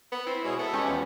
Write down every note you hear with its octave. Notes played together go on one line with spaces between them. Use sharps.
B3
C4 E4
B2 G#3 G#4 C#5
B3 A4 E5
G#3 C#4 G4
E2 F3